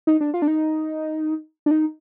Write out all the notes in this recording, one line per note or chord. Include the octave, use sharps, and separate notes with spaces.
D#4
D4
F4
D4
D#4
D4
D#4